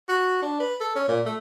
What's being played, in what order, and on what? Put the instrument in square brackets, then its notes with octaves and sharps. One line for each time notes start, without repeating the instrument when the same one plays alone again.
[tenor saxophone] F#4
D4
B4
A4
C#4
A#2
A3